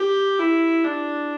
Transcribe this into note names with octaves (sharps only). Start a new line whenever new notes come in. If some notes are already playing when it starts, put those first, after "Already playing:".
Already playing: G4
E4
D4